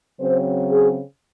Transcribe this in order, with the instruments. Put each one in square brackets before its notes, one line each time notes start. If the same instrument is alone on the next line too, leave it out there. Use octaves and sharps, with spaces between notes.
[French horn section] C#3 F#3 C4 C5
G#4